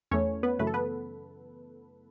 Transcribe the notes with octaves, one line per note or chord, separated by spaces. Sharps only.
E2 E3 A3 C#4 C#5
B3 B4
F#2 C#3 E3 A3 B4
A4
B3 B4